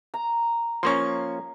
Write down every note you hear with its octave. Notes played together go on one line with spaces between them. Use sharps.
A#5
F3 A#3 C#4 C6 C#6